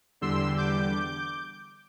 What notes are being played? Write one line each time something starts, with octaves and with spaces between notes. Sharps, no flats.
E2 D3 G3 C6 E6
D6 G6